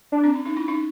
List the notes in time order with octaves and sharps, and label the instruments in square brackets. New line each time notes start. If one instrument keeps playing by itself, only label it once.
[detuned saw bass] D4
[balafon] C4
C#4
C#4 D#4
D4 E4
C#4 D#4